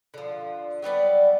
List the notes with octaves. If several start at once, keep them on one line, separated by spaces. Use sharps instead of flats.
D3 F3
F#3 G3 B3 D5